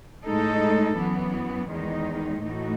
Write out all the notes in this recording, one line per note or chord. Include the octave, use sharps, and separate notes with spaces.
A2 G#3 D#4 A4
F#2 E3 B3
E2 D#3 G#3 D#4
A2 E3 A3 D#4 F#4